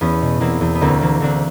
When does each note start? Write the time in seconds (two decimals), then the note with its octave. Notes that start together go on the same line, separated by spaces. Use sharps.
0.01 E2 B3 C#4
0.22 B2
0.41 E2 A#3 C4
0.61 E2
0.75 B3
0.81 D2 A#3 C4
1.01 E3 A#3 C4
1.20 D2 C4 D4